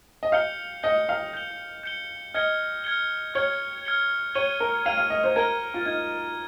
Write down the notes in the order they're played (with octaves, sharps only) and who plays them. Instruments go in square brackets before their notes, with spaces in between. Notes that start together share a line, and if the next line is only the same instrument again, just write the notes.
[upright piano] D#5
[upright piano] F5 [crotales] G6 C#7 G7
[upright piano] D#5 [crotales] G6 C#7 G7
[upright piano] F5
[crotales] G6 C#7 G7
G6 C#7 G7
[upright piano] D#5 [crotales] F6 G#6 C#7 G7
[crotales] F6 G#6 C#7 G7
[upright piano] C#5 [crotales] F6 G#6 C#7 G7
[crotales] F6 G#6 C#7 G7
[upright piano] C#5 [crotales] G#6 D#7 G7
[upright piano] A#4
[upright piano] F5 [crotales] G#6 D#7 G7
[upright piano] F5
D#5
C5
[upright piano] A#4 [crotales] G#6 D#7 G7
[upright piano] F4
[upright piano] D#4 [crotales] G#6